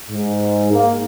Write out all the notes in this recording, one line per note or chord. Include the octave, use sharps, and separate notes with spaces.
G#2
A#3